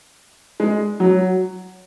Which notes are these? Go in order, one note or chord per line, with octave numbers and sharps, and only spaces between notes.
G#3
F#3